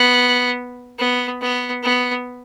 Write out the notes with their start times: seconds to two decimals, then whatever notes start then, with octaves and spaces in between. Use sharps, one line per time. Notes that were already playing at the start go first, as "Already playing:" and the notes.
Already playing: B3
0.99 B3
1.41 B3
1.83 B3